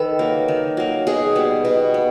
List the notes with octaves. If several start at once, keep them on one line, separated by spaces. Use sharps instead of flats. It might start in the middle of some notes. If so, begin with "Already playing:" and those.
Already playing: D#3 A4 B4
F#3 A#3
D#3
F#3 A#3
B2 G#4
G3 B3
B2
B3